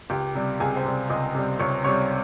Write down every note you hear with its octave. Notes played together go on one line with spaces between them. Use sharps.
C#2 G4 G5
C3 G3
C#2 G#4 G#5
C5 C6
C3 G3
C#2 D#5 D#6
C3 G3
C#2 C#5 C#6
C3 G3 C#5 C#6